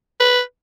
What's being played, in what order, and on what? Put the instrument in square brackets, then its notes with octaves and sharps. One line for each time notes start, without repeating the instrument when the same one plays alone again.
[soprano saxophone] B4